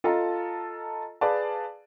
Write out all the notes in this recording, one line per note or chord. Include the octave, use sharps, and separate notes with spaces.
F4 A4 D#5 A5 A#5
G#4 B4 D5 F5 A5